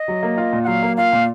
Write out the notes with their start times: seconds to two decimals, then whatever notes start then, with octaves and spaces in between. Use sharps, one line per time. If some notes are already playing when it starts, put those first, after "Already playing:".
Already playing: D#5
0.08 F#3
0.23 A#3
0.37 F4
0.53 A#2
0.64 F#5
0.67 F#3 F5
0.82 A#3
0.97 F4 F5
1.13 A#2